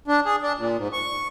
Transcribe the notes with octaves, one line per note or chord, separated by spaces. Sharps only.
D4
G#4
D4
A#2
G#2
C#6